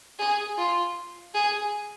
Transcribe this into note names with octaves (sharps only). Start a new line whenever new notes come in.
G#4
F4
G#4